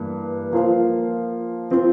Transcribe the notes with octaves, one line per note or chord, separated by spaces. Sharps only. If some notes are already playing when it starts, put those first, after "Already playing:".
Already playing: G2 E3 A#3
F3 A#3 F4 C5 F5
F3 C4 F4